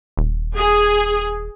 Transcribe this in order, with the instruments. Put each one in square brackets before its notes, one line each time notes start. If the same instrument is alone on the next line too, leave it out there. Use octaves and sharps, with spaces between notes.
[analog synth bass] D#1
[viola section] G#4